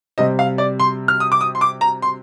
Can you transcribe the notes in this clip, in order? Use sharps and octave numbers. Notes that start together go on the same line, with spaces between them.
C3 G3 C4 D#5
F5
D5
C6
F6
D#6
D6
D#6
C6
D6
A#5
C6